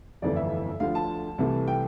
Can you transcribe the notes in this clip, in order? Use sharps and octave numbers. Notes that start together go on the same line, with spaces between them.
G1 F2 E3 A3 D5
E5
D2 D3 F3 F5
A5
C2 C3 E3 A3
G5